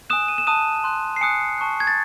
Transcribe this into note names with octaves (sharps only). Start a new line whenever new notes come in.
G#5 D#6 F#6 E7
D#7
E7
A5 D#6 F#6 D#7
C6 F#6
C7
G#5 D#6 F#6 C#7
A5 C#6 F#6
G#6
A6